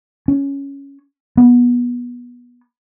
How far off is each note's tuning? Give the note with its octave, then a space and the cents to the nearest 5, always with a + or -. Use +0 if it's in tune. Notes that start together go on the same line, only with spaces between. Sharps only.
C#4 +5
B3 -20